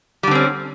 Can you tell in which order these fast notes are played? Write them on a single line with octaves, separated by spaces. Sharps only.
G3 D3 C4 C#4